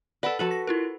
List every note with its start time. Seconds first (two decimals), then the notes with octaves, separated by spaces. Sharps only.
0.23 A4 B4 D5 F#5 B5
0.39 F3 F#4 A4 B4 F#7
0.51 A#6
0.67 E4 F4 A#4